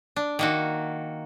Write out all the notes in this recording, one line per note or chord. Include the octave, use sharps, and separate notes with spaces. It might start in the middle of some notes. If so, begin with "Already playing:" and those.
D4
D#3 A#3 F#4